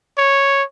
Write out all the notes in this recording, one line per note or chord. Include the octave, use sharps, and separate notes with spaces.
C#5